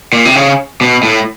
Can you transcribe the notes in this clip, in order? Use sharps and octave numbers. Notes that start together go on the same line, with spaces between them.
A#2
C3
C#3
B2
A2